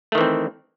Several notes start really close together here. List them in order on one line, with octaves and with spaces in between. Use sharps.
A3 D#3 E3 C4